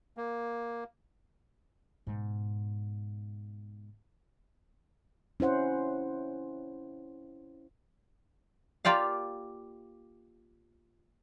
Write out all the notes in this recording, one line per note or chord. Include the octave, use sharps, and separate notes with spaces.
A#3
G#2 B2
C#4 E4 C5 F#5
A#3 F4 G4 D5 F5